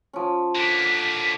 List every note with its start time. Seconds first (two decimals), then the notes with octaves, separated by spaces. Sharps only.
0.13 F3 C#4
0.56 D3 A#3 B6